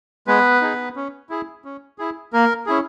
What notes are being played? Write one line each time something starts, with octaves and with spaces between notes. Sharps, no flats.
G#3 B3 B4
D#4 G#4
C#4
E4 G#4
C#4
E4 G#4
A#3 A#4
C#4 E4 G#4